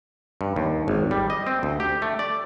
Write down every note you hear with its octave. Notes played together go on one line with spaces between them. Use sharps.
G2
D#2
G#1
G3
D#5
C4
D2
G4
A3
D5